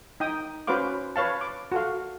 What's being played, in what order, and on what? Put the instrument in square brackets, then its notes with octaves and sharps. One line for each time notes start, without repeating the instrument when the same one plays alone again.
[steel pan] D#4 G5 D#6
C#4 F#4 B4 C5 F5 D6
B4 C#5 F5 A5
D6
F#4 A4 F5